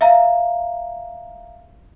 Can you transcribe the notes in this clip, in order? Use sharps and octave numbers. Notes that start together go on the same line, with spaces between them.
E5 F5 A#5